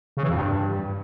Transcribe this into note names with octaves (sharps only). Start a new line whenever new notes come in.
C#3
E3
F2
G2